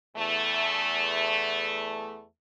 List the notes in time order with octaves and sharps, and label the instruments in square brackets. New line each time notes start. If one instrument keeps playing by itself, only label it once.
[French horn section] E2 A3